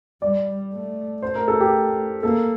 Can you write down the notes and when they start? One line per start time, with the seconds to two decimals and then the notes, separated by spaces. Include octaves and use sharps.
0.22 G3 D5
0.72 A3
1.22 A3 C5
1.35 A#4
1.48 A4
1.60 G4
2.23 A#3 A4